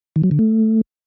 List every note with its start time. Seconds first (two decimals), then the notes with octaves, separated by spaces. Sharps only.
0.16 D#3
0.24 F#3
0.31 D3
0.39 A3